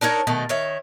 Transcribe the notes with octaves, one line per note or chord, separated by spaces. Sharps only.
D4 D#4 A#4 C#5
B2 D#3 A3
D#3 C#5 E5